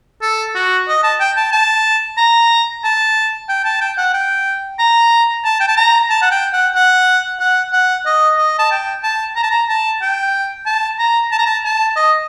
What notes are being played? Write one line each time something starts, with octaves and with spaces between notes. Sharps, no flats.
A4
F#4
D#5
A5
G5
A5
A5
A#5
A5
G5
A5
G5
F#5
G5
A#5
A5
G5
A5
A#5
A5
F#5
G5
F#5
F#5
F#5
F#5
D#5
D#5
A5
G5
A5
A#5
A5
A#5
A5
G5
A5
A#5
A5
A#5
A5
A5
D#5